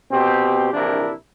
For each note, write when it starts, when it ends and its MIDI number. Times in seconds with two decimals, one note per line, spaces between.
0.11 0.70 47
0.11 0.70 60
0.11 0.70 67
0.73 1.12 34
0.73 1.12 48
0.73 1.12 52
0.73 1.12 62
0.73 1.12 64
0.73 1.12 70